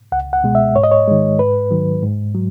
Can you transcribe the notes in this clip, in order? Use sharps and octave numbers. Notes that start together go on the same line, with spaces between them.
C#2 F#5
F#5
B2 G#3
E5
G#2 C#5
D#5
C#5
D#3 G#3
G#2 B4
D#3 F#3
G#2
F#3